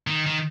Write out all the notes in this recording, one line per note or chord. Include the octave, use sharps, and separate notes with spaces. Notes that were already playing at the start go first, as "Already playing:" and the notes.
D#3
D#3